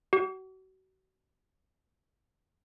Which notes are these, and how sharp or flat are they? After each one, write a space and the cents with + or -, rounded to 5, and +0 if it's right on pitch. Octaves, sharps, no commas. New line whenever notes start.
F#4 +35